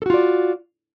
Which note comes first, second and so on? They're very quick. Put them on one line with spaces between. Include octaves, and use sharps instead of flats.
A4 F#4 F4 D5